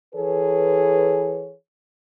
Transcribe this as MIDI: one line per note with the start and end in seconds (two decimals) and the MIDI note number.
0.15 1.53 52
0.15 1.53 68
0.15 1.53 69
0.15 1.53 71
0.15 1.53 73